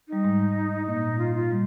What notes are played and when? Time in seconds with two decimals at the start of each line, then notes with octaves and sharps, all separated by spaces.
0.08 G3 D#4
0.24 G#2 G#3
0.87 A#2 A#3 D#4
1.18 F4
1.35 F4
1.51 G3